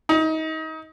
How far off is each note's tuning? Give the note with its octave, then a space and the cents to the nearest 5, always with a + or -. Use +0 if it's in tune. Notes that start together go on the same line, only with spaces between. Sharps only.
D#4 +30